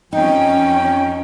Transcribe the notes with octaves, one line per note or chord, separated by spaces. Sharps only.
F2 C#4 D#4 G5